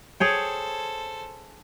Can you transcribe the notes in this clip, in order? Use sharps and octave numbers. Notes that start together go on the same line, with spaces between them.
G#4 A4 C5 C#5 G5